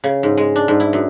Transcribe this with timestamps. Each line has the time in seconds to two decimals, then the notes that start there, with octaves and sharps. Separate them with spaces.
0.04 C#3
0.23 G#2
0.37 G#3
0.56 D4
0.68 G#2
0.80 E4
0.93 F#2